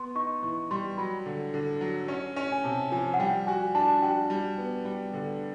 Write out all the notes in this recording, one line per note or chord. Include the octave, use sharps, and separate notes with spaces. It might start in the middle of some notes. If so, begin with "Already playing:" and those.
Already playing: B3 C6
D#4 C#6
E3 C#6
G3 C6
F#3 B5
D3
D3
F#3
C#4
C#4
G#5
C3 A5
F3 G#5
F#5
G3 G5
F#4 G#5
D4 A5
F#4 G5
G3
B3
G3
D3